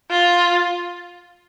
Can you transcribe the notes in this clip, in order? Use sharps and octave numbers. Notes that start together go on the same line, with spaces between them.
F4